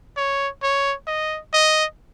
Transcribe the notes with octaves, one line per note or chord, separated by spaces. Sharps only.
C#5
C#5
D#5
D#5